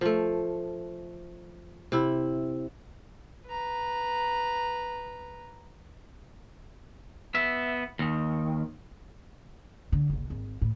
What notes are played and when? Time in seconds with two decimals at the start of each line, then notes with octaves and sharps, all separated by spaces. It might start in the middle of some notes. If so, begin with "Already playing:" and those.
0.01 F3 A3
1.92 C3 E4
3.47 B4 A#5
7.35 B3 E5
7.99 D#2 D#3
9.92 D3
10.10 F#1 C2
10.30 G#1
10.61 A2